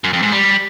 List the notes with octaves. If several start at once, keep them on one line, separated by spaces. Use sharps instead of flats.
F#2
F2
G#2
G3